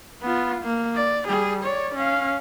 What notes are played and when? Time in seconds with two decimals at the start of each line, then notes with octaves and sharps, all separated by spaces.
0.22 B3 F4
0.63 A#3
0.95 D5
1.26 G3 G#4
1.64 C#5 D5
1.95 C#4 F5